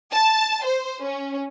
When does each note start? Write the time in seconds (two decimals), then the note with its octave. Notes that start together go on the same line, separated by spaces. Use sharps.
0.12 A5
0.64 C5
1.02 C#4